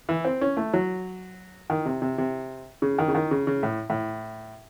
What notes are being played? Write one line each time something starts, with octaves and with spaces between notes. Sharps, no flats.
E3
C4
C#4
A3
F#3
D#3
C3
C3
C3
C#3
D#3
C#3
D#3
C#3
C#3
A2
A2